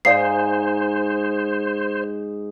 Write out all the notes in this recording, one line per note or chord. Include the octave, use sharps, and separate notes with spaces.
G#2 G#4 C5 D5 F5 C7